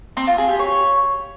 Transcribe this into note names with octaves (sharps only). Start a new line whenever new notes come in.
C4
F4
G#4
G4
C#5